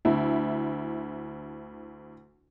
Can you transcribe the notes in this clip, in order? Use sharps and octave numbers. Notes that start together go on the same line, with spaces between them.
D2 E4